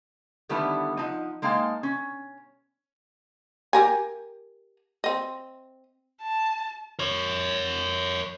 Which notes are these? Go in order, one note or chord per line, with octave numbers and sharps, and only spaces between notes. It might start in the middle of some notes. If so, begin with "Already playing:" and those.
D3 D#3 G3 A3 B3 E4
F3 D#4 F#5
G#3 A#3 D#4 F5 G5 A5
C#4
G4 A#4 G#5
C4 D#5
A5
A#4 C#5